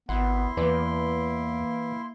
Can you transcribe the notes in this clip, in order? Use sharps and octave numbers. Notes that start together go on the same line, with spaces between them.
G#1 B3 E4 F#5 C6
E2 E3 A#3 B4 D5